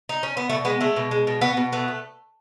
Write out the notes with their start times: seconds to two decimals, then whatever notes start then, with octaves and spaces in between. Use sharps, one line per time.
0.09 D#4
0.23 C#4
0.37 B3
0.50 B2 A3
0.65 G#3 B3
0.81 G#3 A3
0.96 B2
1.11 G#3
1.27 B2
1.41 B2 B3
1.57 B2
1.73 A3 B3
1.88 A3